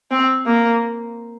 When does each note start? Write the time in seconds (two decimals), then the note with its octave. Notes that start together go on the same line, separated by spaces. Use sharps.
0.11 C4
0.46 A#3